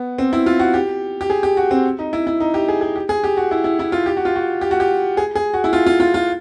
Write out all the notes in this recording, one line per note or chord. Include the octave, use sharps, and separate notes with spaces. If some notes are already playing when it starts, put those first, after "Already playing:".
Already playing: B3
C4
E4
F4
F#4
G4
G4
G#4
G4
F#4
C4
D#4
E4
E4
D#4
G4
G#4
G#4
G4
G#4
G4
F#4
E4
E4
E4
F4
G4
F#4
F4
F#4
G4
F#4
G4
G#4
G#4
F#4
E4
F4
F4
F4
F4